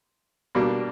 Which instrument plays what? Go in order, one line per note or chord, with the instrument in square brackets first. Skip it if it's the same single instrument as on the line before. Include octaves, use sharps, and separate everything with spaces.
[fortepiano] B2 G3 A#3 D4